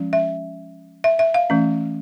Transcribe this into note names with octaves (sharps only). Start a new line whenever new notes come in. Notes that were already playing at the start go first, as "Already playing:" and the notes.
Already playing: F3 G#3 C#4
E5
E5
E5
F5
E3 A3 C#4